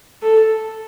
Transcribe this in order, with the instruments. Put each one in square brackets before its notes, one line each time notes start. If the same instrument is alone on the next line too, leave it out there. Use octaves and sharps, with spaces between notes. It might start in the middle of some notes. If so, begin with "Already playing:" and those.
[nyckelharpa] A4